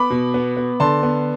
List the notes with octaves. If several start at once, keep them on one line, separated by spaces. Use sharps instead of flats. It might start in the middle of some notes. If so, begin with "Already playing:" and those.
Already playing: B3 B5 D6
B2
B3
B3
D3 A5 C6
B3